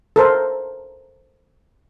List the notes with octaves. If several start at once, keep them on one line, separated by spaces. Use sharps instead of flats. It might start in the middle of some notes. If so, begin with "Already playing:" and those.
A4 A#4 C5 A5